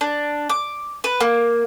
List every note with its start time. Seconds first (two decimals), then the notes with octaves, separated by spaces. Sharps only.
0.01 D4
0.49 D6
1.04 B4
1.21 A#3